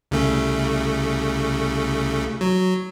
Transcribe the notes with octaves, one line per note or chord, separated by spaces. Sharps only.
C2 C#3 A3
F#3